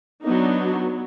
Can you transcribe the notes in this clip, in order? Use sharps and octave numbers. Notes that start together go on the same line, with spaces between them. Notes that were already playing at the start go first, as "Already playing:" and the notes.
F#3 B3 D4 D#4